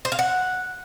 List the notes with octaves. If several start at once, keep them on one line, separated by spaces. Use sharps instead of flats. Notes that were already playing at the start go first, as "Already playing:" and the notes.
C5
F5
F#5